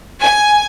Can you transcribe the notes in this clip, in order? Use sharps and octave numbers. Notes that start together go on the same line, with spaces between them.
G#5